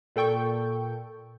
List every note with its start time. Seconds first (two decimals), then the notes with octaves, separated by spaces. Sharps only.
0.16 A#2 A4 G5 C#6 G6